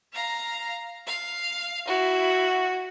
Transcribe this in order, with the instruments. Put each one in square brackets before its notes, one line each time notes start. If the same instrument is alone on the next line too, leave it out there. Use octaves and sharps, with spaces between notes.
[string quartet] F5 A#5
F5
[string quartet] E4 [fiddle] F#4